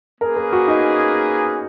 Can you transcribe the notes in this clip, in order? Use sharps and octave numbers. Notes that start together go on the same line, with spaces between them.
A#3 C#4 G#4 A#4 B4
A#4
F#4
D#4